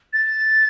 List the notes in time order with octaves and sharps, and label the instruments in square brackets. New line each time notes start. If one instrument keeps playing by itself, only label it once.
[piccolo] A6